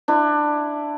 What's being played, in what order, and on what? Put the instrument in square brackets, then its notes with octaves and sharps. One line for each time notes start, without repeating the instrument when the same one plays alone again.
[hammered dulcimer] D4 E4